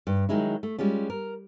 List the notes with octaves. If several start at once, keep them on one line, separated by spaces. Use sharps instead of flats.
G2
D#3 F#3 G#3 D#4 E4
A3
G3 G#3 C#4 F4
A#4